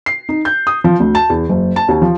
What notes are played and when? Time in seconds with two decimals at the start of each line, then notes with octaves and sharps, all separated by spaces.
0.06 C7
0.29 D#4
0.45 G6
0.67 D#6
0.84 F3
1.00 D2
1.15 A5
1.30 E2
1.49 F#1
1.76 A5
1.88 D#2
2.02 F3